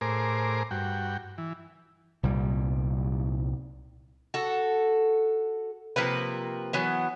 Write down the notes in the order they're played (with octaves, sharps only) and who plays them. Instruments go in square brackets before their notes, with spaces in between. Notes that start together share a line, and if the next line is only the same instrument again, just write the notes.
[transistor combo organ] A2 G#4 A#4 C5 D6
G2 F#4 G5
E3
[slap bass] C2 A#2 G3
[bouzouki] F#4 A4
C3 F3 A#3 B4
E3 F#3 B3